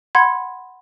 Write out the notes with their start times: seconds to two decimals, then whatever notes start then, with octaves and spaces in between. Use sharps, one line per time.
0.15 F#5 B5 C6 G#6